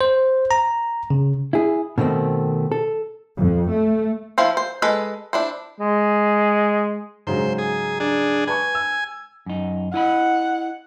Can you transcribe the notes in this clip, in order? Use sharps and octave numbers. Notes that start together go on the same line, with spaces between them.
C5
A#5
C#3
E4 G#4
B2 D#3 A3 C4
A4
F2
A3
F3 E4 F4 C5
C5
G#3 A4 B4
D4 E4 C5
G#3
G#2 C#3 F#3 C5
G#4
D4 G#4
B4 G#5 A5 C#6
E6
F#2 D#4
E4 D#5 F#5 B5